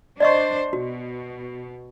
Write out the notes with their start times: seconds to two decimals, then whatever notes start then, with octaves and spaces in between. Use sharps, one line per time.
0.20 D4 C5 D5 D#5 C#6
0.73 B2 F#4